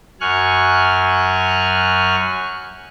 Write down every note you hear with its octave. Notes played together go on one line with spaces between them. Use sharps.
F#2 G#5 C#6 F6 F#6